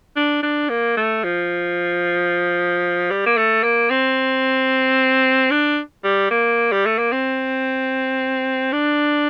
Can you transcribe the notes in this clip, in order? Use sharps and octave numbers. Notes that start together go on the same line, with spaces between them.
D4
D4
A#3
A3
F3
G3
A#3
A3
A#3
C4
D4
G3
A#3
G3
A3
A#3
C4
D4